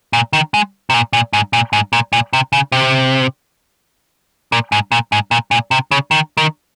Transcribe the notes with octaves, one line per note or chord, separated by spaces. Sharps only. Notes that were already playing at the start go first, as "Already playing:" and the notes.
A#2
D#3
G#3
C3
A#2
A#2
G#2
A#2
G#2
A#2
A#2
C3
C#3
C3
A#2
G#2
A#2
G#2
A#2
A#2
C3
C#3
D#3
D#3